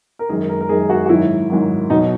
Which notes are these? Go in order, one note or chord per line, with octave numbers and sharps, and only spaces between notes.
A#4
F#2 D#3 G#3 G#4
A#4
A#4
F#2 D#3 G#3 G#4
F#4
F#4
G#2 D#3 F#3 E4
G#2 D#3 F#3
B2 F#3 D#4